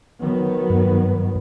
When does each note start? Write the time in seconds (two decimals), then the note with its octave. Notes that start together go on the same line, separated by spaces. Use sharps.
0.20 D#3 F#3 B3
0.70 G2